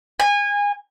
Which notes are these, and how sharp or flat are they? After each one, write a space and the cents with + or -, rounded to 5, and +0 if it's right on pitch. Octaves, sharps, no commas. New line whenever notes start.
G#5 -25